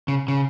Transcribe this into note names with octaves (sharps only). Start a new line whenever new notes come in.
C#3
C#3